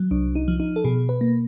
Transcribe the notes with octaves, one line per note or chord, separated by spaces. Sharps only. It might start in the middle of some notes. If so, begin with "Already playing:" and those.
Already playing: F#3
C2 D4
D#4
F3
D#4
A4
B2 G#4
B4
A#3